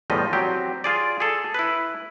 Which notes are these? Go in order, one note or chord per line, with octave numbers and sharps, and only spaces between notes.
E2 A2 F3 G3 D#5
F#3 C4 G4
F4 G#4 D5
G#4 A4
E4 B4